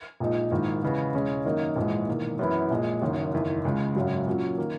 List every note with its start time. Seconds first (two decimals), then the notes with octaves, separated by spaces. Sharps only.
0.20 A#1 A#2 G#3 D#4
0.51 A#1 G#2 D#3 A#3 E4
0.83 E2 C#3 G#3 B3
1.14 E1 E2 C#3 G#3 C#4
1.45 F#2 D#3 A#3 D#4
1.76 A#1 G#2 E3 G#3
2.07 E1 E2 D#3 A#3
2.39 F#2 E3 B3 E4
2.71 A#1 A#2 G#3
3.02 F#1 F#2 D#3
3.33 F#1 E2 D#3
3.65 C#2 C#3 G#3
3.96 G#1 F#2 C#3 F#3
4.26 A#2 F#3 C#4
4.58 D#3 A#3